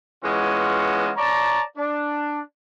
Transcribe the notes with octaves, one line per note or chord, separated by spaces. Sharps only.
E3 G#3 B3 C#4 F4 F#4
C#5 D5 A5 A#5
D4